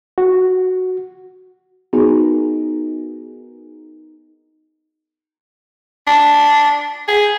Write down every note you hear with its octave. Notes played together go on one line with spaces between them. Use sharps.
F#4
B3 D#4 F#4 G#4 A#4
D4
G#4